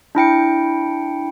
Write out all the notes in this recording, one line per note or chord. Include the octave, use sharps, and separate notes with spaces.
D4 E4 G5 C#7